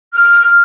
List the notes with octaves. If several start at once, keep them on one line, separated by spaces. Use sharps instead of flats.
F6